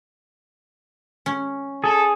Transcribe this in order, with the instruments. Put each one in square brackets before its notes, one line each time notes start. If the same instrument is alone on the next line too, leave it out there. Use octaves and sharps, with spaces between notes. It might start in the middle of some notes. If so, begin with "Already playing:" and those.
[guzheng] C#4
[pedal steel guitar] G#4 [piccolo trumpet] A4